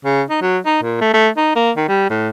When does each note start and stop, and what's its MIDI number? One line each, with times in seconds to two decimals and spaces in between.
0.05 0.22 49
0.30 0.40 63
0.41 0.58 54
0.66 0.82 63
0.82 0.97 46
1.01 1.10 57
1.13 1.29 57
1.37 1.56 63
1.56 1.71 58
1.77 1.85 51
1.88 2.09 55
2.10 2.30 45